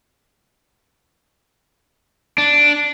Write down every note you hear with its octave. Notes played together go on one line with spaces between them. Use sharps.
D4